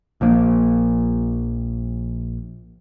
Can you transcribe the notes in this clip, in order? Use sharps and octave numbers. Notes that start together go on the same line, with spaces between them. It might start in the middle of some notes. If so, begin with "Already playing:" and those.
A#1 F3 A#3